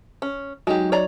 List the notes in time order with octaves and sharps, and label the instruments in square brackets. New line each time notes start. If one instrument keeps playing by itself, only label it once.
[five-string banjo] C#4
[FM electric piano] F#3 D#4 [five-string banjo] G#3 G4
[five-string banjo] C#5 D5 A#5